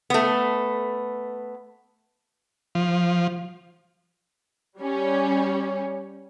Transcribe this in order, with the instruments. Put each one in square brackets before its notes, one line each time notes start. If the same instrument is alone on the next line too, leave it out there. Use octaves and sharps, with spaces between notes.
[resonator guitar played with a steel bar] A3 B3
[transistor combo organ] F3
[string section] G3 C#4